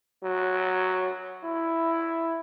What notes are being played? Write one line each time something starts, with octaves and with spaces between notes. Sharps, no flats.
F#3
E4